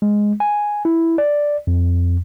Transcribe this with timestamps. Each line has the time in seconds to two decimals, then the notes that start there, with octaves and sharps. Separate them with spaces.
0.02 G#3
0.40 G#5
0.85 E4
1.18 D5
1.67 F2